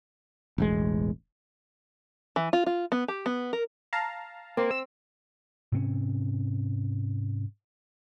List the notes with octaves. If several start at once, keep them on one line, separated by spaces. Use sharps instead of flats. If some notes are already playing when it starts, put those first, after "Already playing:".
E1 A1 G#3
E3
F4
F4
B3
G4
B3
A#4
F5 A5 A#5
A#3 C4
E6
G#2 C3 C4 C#4